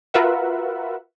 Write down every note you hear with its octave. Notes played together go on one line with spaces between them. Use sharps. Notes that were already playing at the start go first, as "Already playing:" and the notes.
F4 F#4 A#4 B4 E5 F#5